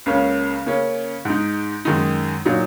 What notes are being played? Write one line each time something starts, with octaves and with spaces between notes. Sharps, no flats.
C#2 C#3 A#3 C#4
C#3 A#3 C#4
G#2 G#3 D#4
F#2 D#3 G#3 D#4
A#2 F#3 D#4